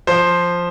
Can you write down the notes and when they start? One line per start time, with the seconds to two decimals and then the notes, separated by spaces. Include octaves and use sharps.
0.07 F3 C5